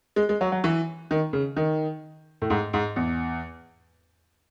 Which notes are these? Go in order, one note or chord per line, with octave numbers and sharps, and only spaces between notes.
G#3
G#3
F#3
F#3
E3
D#3
C#3
D#3
A2
G#2
G#2
E2